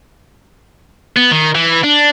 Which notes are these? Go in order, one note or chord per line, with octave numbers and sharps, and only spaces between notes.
B3
D#3
E3
D4